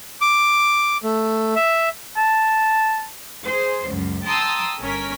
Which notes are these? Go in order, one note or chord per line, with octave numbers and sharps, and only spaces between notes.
D6
A3
E5
A5
G#4 C5
C#2 F#2
G5 A5 A#5 C6 D#6 E6
G1 C#4 A#4 B6